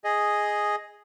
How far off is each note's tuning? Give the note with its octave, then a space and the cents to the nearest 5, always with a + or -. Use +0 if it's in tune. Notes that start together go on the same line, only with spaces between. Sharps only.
G#4 +0 D#5 +0